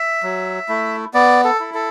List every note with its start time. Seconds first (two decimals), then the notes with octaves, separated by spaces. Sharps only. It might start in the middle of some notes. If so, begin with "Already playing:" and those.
Already playing: E5
0.23 F#3
0.69 A3 E4
1.14 B3 D5
1.44 A4
1.60 E4
1.74 A4